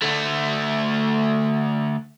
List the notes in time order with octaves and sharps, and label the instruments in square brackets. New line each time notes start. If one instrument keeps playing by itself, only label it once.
[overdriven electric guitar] D2 A3